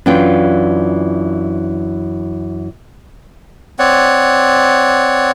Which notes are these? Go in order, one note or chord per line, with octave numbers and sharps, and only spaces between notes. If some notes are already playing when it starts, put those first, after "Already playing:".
F#2 E3 D4 F4 G5
C4 C#5 D5 F#5